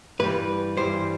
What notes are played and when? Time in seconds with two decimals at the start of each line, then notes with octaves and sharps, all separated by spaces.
0.19 G2 E3 G3 B4
0.77 G2 E3 G3 C5